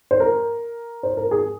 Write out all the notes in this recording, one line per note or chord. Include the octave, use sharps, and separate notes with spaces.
C5
A#4
C5
A#4
G#4